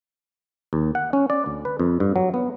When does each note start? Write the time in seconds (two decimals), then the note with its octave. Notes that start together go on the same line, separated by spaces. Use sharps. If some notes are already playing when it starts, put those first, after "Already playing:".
0.73 D#2
0.95 F#5
1.13 C#4
1.30 D5
1.46 D2
1.65 B4
1.79 F2
2.00 G2
2.16 F#3
2.34 B3